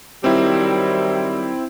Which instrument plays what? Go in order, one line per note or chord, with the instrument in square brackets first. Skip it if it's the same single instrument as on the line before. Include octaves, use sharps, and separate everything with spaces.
[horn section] D#3 F#3 G3 [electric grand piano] C4 E4